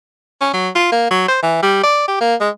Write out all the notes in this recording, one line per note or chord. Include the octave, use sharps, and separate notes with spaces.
C#4
F#3
F4
A#3
F#3
C5
E3
G3
D5
G4
A#3
G#3